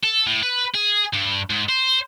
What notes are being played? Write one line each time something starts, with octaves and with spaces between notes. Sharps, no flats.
A4
A2
B4
G#4
G2
G#2
C5